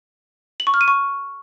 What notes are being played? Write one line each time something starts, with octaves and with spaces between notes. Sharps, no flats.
F#7
C#6
F6
D#7
C#6